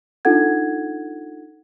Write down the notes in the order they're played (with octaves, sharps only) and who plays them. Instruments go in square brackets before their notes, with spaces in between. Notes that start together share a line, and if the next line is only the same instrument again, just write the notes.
[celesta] D4 D#4 F4 A4 F#5 G#6